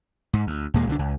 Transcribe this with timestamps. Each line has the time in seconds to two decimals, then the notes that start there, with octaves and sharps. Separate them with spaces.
0.33 G#2
0.47 D2
0.74 D#2 A#2 G#3 A#3
0.87 C2 D3 F3 D4
0.99 C#2